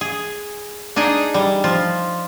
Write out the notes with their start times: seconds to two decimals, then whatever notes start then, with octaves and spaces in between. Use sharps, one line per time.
0.01 G#4
0.96 D4 D#4 G#4 D#5
1.34 G3
1.64 F3 F4